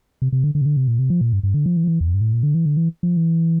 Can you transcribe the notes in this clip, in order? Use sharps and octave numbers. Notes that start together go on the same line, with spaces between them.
C3
C3
D3
D3
C3
D3
C3
A#2
C3
F3
A#2
G2
G2
D3
F3
E3
F3
E3
E2
F2
G2
A2
A#2
D3
E3
D3
E3
F3
E3